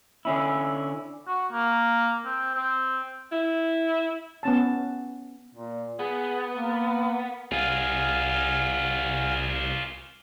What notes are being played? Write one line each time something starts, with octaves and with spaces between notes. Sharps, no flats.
D3 C#4 E4
F#4
A#3
C4
C4
E4
B3 C#4 A5
A#2
B3 G#4
A#3
C2 F4 G#4 F5 F#5 G#5